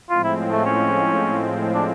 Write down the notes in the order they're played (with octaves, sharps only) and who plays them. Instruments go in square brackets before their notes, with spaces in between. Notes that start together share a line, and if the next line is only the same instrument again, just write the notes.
[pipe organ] A2 F3 G#3 C4 [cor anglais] F4
[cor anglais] E4
A3
C#4
D4